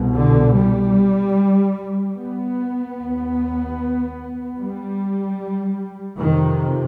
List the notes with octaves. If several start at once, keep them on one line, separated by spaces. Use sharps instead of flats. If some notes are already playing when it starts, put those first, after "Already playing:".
Already playing: C2 B2
D3
G3
B3
D#2
G3
F2 C3 D#3